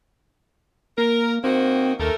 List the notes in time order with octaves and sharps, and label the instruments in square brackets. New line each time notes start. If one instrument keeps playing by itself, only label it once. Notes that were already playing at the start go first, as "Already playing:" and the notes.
[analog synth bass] A#3 [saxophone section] A#4
[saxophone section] D#3 A#3 F#4 [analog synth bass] C4
[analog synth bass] D#2 [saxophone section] A3 A4 A#4